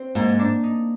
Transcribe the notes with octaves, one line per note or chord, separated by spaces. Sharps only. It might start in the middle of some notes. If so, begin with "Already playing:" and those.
Already playing: C4
G#2 A#3
D4
D#4